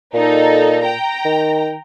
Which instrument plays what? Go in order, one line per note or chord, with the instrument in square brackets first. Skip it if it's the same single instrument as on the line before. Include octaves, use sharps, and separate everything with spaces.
[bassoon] A#2 [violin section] D#4 A4
[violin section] G5 A#5
[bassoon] D#3